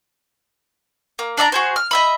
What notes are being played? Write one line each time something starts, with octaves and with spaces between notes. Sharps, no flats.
A#3
D4 D5 E5 A#5
F#4 G#4 C5
F6
D#5 E5 B5